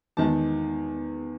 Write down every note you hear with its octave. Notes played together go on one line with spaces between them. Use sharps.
E2 D#3 G#3 A5